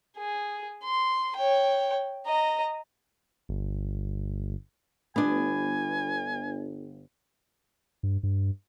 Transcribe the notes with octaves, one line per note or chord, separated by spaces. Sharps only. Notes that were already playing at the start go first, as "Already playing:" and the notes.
G#4
C6
C#5 G5
D#5 A#5
G1
G1 B3 D4 G#5
G2
G2